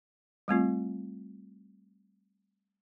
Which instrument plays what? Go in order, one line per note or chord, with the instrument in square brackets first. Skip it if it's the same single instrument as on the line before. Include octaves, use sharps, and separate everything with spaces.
[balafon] G3 A3 C4 F4